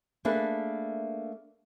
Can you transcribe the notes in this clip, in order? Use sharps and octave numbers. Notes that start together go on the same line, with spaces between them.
A3 A#3 D4 G#4 B4